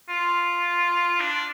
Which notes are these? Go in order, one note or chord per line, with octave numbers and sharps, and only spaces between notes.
F4
D4